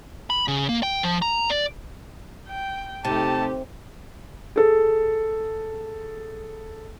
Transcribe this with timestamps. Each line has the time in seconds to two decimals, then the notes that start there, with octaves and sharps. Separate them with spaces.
0.30 B5
0.48 C#3
0.69 A#3
0.83 G5
1.03 F3
1.22 A#5
1.50 D5
2.48 G5
3.05 C3 A3 D#4 G4 A5
4.56 G#4 A4